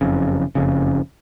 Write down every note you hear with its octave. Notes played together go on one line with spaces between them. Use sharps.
F#1 F2 C#3
F#1 F2 C#3